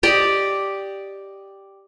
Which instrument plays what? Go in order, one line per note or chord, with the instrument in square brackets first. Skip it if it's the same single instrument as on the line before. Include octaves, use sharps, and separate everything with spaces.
[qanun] G4 D5 D#5